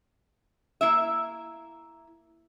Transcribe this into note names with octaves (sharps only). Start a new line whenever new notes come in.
A#3 E4 E5